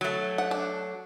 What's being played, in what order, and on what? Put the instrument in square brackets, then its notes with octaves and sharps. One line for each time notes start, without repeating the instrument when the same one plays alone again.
[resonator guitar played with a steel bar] F#3 A3
[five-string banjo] F#5
D4